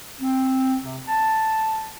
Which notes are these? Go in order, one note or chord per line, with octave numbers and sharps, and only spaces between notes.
C4
C3
A5